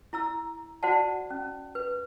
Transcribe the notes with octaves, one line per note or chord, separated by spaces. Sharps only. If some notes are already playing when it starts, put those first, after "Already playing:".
E4 A#5 E6
F#4 C5 D5 F#5 A5
C#4
B4